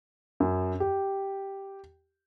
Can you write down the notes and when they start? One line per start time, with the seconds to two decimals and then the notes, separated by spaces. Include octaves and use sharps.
0.40 F#2
0.80 G4